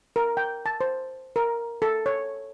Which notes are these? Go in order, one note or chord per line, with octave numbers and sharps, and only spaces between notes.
A#4
G5
A5
C5
A#4
A4
C#5